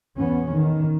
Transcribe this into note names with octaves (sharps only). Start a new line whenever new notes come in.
E2 B3 C#4
D#3